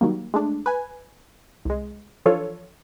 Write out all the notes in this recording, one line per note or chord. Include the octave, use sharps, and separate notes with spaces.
D#3 F#3 G3 A#3
G#3 A3 D4
B4 G#5
C2 G#3
E3 F3 D4 F4 A4 C#5